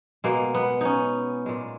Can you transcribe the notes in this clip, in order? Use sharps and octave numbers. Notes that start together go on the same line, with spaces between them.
B2 G#3 A#3
B3
C#4 D#4
A#2 G#3